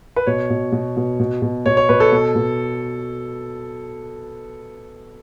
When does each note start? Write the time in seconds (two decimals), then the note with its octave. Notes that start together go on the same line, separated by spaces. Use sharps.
0.16 B4
0.27 B2 C#5
0.50 B2
0.72 B2
0.97 B2
1.20 B2
1.42 B2
1.66 B2 C#5
1.77 C#5
1.89 B2 B4
2.00 A4
2.12 B2
2.35 B2